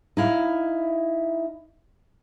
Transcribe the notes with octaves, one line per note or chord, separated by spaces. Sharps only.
D#4 E4 F5